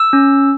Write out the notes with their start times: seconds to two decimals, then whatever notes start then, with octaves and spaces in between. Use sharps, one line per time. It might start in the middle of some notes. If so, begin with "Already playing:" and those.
Already playing: E6
0.13 C#4